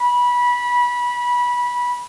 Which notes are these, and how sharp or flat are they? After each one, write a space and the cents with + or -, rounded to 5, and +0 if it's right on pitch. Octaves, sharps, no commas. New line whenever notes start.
B5 -20